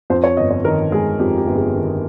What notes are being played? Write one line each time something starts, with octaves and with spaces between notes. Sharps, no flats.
F2 C5
C#5
G1 D#5
C#5
D#3 A#4
G#3 G#4
F2 G4
G4
G1
G#4
D#3